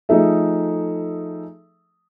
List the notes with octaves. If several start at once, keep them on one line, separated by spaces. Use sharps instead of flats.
F3 A3 D#4 G#4 A4 E5